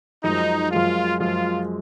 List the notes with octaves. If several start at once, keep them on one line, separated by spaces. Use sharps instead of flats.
F#2 F3 G#3 D#4
F#2 F3 G#3 F4
F#2 F3 G#3 F4